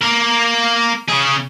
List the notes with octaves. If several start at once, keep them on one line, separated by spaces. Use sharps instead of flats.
A#3 A#4
C#3 G#4